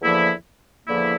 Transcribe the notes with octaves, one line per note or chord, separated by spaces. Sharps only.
E2 D3 F3 A#3 E4
E2 D3 F3 A#3 E4